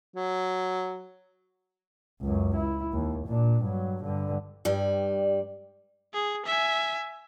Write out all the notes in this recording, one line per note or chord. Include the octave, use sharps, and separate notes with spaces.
F#3
C#2 F#2
E4
D#2
A#2 D4
G2 F#3
G2 D3
G2 G3
G#4
E5 G#5